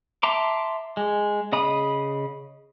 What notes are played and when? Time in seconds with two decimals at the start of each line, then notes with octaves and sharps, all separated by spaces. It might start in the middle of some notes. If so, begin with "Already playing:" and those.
0.23 E5 A5 A#5 C6 D6
0.97 G#3
1.52 C#3 D#5 B5 D#6